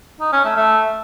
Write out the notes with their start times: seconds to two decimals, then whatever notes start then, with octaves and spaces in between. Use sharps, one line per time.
0.20 D#4
0.32 C#4
0.44 A3
0.56 A3